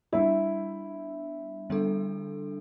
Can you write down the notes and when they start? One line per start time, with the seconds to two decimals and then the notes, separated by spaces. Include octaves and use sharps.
0.13 G3 B3 D4 E4
1.70 D3 G3 B3 D4 A4